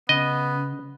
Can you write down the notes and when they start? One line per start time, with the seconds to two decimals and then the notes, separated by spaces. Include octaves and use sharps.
0.09 C#3 B3 D#5